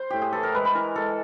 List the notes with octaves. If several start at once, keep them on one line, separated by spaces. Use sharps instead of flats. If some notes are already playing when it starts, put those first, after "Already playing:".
Already playing: C5
A2 G4
G#4
E3 A4
A#4
G#3 B4
B4
E3 A#4
G#3 A4